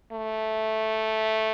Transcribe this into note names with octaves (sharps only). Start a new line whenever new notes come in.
A3